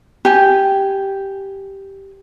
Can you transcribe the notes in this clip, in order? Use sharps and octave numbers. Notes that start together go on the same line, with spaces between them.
G4 G#5